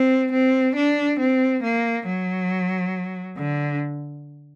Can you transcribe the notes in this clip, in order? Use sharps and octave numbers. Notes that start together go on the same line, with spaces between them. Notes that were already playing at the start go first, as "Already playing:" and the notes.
Already playing: C4
C4
D4
C4
A#3
F#3
D3